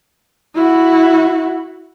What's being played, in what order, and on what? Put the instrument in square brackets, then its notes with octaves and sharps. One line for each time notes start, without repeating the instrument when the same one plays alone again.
[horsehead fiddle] E4 F#4